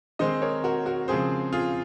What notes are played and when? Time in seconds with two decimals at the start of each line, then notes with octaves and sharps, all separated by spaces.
0.19 D#3 G#3 C4 C5 D#5
0.42 A#4 C#5
0.64 F#4 A#4
0.86 F#4 A#4
1.08 C#3 F3 G#3 C4 G#4 C5
1.53 F4 G#4